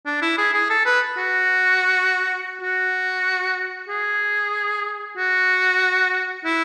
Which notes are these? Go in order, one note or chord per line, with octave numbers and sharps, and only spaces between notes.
D4
E4
G#4
G#4
A4
B4
F#4
F#4
G#4
F#4
E4